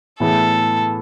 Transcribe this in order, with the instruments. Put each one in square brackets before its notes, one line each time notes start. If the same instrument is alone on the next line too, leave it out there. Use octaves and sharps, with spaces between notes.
[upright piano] A2 E3 B3 E4 G#4 [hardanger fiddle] A4